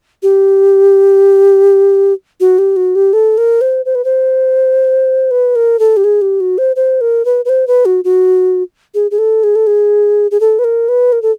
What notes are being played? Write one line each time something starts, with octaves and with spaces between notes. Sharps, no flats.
G4
F#4
G4
F#4
G4
A4
A#4
C5
C5
B4
C5
B4
A#4
A4
G4
G#4
G4
F#4
C5
C5
A#4
B4
B4
C5
B4
F#4
F#4
G#4
G#4
A4
G#4
A4
G#4
G#4
A4
B4
A#4
B4
A#4
A4